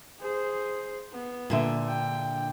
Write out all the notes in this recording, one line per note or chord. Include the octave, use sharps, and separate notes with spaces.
G#4 C5
B3
A#2 D3 E5
G5